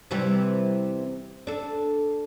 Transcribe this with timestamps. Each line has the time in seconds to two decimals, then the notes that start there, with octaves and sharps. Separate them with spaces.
0.11 C3 E3 G3
1.47 D4 A4